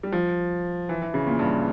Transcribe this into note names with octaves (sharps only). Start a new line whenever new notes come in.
G3
F3
E3
E3
C#3
A#2
G2